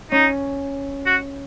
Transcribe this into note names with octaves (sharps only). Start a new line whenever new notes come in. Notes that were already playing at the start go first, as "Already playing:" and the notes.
C#4 D#4
F#4